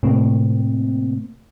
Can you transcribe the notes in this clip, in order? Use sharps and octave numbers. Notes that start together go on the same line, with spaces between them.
A2 C3 A#3 C4